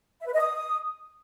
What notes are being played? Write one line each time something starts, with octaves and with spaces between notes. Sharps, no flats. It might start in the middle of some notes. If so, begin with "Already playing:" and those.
E5
B4
D#5
D#6